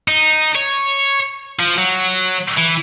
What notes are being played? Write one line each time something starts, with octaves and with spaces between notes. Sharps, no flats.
D#4
C#5
F3
F#3
E3